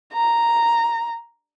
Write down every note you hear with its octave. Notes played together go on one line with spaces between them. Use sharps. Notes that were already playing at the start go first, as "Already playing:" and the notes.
A#5